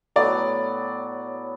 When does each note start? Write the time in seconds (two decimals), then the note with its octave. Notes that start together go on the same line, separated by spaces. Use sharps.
0.16 A2 F#3 B3 D5